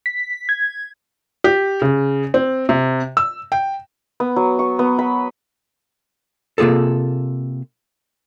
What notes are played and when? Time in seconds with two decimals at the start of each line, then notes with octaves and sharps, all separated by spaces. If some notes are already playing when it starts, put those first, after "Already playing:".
0.06 B6
0.49 G#6
1.44 G4
1.82 C#3
2.34 C4
2.69 C3
3.17 E6
3.52 G5
4.20 B3
4.36 F#3
4.59 C#6
4.79 B3
4.99 B5
6.58 C3 A#3 F4 G#4 A4